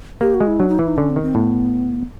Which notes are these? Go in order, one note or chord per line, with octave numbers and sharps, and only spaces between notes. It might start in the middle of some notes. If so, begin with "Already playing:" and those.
A#3 G4
F#4
G#3
E4
F#3 D4
D#4
E3 E4
D#4
D3 C#4
C4
D#3
C4
A2 B3